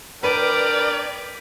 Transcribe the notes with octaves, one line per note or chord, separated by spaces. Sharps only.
D4 A#4 B4 D5 G5 B6 D#7